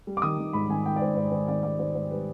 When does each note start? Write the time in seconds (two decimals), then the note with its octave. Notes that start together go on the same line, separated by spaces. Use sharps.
0.07 G3
0.17 D6
0.22 D#3 D#6
0.39 D#3
0.53 G#2 B5
0.69 D#3 G#5
0.85 D#3 G5
0.96 D5
1.01 G#2 C5
1.17 G#2 C5
1.32 D#3 C5
1.48 D#3 D5
1.63 G#2 D5
1.79 D#3 C5
1.95 G#2 C5
2.11 G3 B4